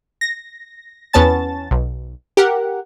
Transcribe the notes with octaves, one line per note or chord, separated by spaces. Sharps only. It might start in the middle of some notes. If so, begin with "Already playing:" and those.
A#6
E2 B3 C#4 A5 A6
B1
G4 A#4 F#5